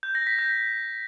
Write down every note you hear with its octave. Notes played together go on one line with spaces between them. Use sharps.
G6
A#6
B6
G6